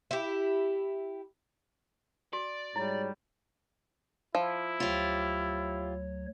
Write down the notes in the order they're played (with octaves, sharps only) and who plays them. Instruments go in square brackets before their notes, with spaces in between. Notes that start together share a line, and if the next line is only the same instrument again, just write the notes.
[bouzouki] E4 G4
[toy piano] F#4 [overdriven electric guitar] D5
[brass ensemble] G#2 F#4 C#5 [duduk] G3 [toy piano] E4
[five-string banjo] F3 [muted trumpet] E4
[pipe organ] D2 F#3 C#5 [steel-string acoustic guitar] F4 G4